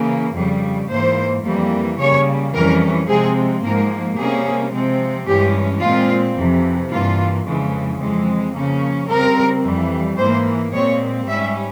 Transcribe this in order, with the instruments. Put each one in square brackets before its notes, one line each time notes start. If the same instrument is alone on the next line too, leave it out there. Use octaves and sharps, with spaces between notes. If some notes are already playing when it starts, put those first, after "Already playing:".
Already playing: [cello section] C#3 E3 A#3
F2 C#3 G3
G#2 E3 A#3 C5
F2 E3 G3 A#3
C#3 G3 A#3 C#5
F2 E3 G3 C#4 A#4
C3 F3 G#3 C4 G#4
G#2 F3 A#3 A#4
C3 G3 A#3 C#4 G#4
C3 F3 G#3 C4
G2 E3 G#3 C#4 G4
A#2 G#3 C4 F4
F2 C3 E3
G2 E3 A#3 F4
F2 C#3 E3 G#3
F2 E3 G#3 C4
C#3 F3 A#3 C#4
C#3 G3 C4 A#4
F2 E3 G3
G#2 E3 A#3 C5
A#2 G#3 C4 C#5
G#2 G3 C#4 E5